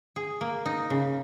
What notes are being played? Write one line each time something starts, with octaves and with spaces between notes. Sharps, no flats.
G#4
A#3
D#4
C#3